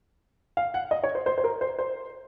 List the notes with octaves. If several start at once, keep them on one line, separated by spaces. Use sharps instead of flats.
F5
F#5
D#5
C#5
C5
C5
C5
A#4
C5
C5